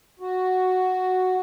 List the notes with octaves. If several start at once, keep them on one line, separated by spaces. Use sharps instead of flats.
F#4